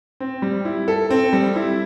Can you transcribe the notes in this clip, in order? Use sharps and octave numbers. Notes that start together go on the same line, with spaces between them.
C4
G3
E4
A4
C4
G3
E4